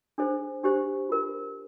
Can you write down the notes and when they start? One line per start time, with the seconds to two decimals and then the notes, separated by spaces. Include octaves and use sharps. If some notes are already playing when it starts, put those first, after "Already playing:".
0.18 D4 G#4 C5
0.63 D4 G4 C5
1.09 F4 A#4